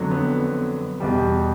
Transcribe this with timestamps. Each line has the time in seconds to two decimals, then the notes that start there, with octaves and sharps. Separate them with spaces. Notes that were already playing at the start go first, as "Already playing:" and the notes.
Already playing: F2 D3 F#3
0.11 B3
0.41 B3
1.00 E2 B2 G3